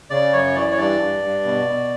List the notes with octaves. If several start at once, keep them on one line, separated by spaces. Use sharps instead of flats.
C#3 D5
F#2 C#5
E3 D5
C#5
G2 D5
G2
G2
B2
B2